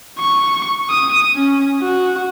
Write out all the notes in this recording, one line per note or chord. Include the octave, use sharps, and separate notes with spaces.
C#6
D#6
C#4
F#4